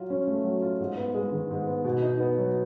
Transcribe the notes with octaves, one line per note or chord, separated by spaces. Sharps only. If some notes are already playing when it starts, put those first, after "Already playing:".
Already playing: F#3 F4
C#4
A3
F#3
F4
G#2
B3
G#3
D#3
G#2
B3
B2
D#4
B3
F#3